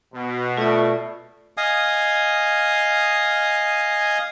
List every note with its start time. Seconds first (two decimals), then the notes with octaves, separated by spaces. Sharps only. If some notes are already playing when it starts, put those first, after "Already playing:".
0.14 B2
0.57 A3 F4 D5
1.57 D#5 F5 G#5 D#6